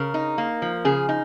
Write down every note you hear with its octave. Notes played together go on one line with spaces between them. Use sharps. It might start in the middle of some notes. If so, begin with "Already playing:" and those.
Already playing: C#3 A#4
D#4
A#3
F3
C#3 G#4
D#4